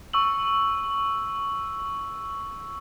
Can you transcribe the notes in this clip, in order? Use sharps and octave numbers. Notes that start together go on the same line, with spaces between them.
C#6 E6 F#7